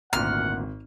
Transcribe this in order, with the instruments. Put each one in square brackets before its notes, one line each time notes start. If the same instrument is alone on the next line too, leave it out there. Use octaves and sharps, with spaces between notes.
[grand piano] G#1 [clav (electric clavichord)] D2 A#2 B3 [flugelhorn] F#5 [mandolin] F6